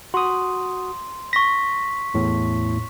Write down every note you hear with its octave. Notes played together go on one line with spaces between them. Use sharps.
F#4 C6 D#6
C#6 A#6 B6
E2 A2